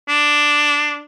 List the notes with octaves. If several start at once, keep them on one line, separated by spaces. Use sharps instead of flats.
D4